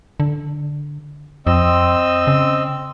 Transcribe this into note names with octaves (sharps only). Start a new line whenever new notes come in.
D3
F2 C4 D#5 E6
C#3